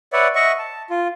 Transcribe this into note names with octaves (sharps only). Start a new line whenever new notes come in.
B4 C#5 D5 E5 F#5
D#5 E5 F#5 C#6
A5
F4